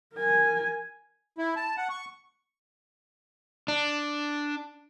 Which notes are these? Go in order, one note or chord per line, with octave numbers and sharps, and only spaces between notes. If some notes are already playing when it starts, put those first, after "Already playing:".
A#4 G#5
E4
A5
F#5
C#6
D4